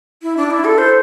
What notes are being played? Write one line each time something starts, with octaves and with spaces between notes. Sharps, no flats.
E4
D4
E4
A4
C5